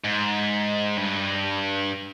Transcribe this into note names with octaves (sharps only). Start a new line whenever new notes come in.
G#2
G2